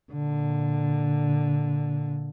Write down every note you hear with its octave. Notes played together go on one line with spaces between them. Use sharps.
A#2 D3